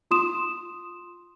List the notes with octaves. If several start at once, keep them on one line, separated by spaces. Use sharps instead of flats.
F4 C6 D#6 E7